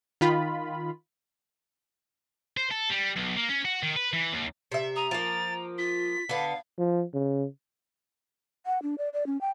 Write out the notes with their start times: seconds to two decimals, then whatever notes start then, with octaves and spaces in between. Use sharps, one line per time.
0.21 D#3 F4 B5
2.57 C5
2.71 A4
2.90 G3
3.16 B1
3.37 A#3
3.49 C#4
3.65 F#4
3.83 D#3
3.96 B4
4.13 E3
4.33 D#2
4.72 C3 E5
4.96 A#5 D#6
5.11 F3 A#3 A6
5.78 F4 B6
6.29 D3 B3 F5
6.78 F3
7.14 C#3
8.66 F#5
8.83 D4
8.98 D5
9.13 D5
9.27 C#4
9.41 G5